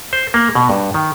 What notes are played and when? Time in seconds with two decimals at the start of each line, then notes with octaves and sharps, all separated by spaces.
0.13 C5
0.34 A#3
0.55 B2
0.70 G2
0.94 D#3